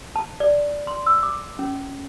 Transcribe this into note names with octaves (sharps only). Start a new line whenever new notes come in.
A5
D5
C6
E6
D6
C#4